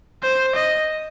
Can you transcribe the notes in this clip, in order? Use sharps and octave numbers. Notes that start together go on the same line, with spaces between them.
C5
D#5